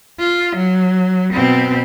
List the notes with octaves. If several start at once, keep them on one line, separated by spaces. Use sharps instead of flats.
F4
F#3
B2 C4